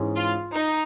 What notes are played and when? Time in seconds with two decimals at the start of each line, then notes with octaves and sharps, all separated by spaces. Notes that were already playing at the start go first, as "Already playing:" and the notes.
Already playing: G#2 E3 G#3 C#4
0.16 F4
0.54 D#4